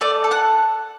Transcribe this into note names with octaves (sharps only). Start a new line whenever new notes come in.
A3 D5 D6
A4
F#5 F#6